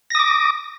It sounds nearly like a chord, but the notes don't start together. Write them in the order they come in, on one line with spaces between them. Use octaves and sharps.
A#6 D#6 D6